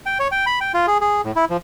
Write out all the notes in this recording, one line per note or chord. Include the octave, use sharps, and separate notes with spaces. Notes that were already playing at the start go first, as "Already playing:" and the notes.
G5
C#5
G5
B5
G5
F4
G#4
G#4
A2
E4
F3